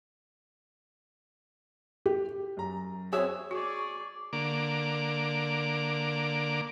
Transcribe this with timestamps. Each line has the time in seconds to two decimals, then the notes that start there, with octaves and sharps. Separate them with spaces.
2.06 G4
2.57 F#2 A#5
3.13 C4 F#4 G#4 C#5 E5
3.51 F#4 G#4 D5 C#6
4.33 D3 A#3 D6